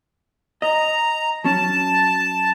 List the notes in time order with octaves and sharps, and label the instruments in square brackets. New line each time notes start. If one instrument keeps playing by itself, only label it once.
[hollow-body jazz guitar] D#5 [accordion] A#5
[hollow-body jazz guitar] F#3 C#4 [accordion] A5